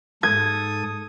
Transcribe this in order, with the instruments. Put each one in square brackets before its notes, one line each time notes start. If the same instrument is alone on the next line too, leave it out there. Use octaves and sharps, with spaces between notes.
[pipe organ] G#2 A4 D#6 [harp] G#6